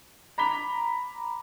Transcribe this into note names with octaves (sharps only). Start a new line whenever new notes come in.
A#5 B5 D6 B6 F7 G7